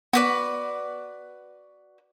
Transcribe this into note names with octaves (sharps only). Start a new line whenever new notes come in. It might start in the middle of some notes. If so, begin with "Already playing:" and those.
B3 F#4 B4 D5